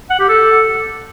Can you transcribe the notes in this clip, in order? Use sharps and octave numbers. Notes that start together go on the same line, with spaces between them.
F#5
G4
A4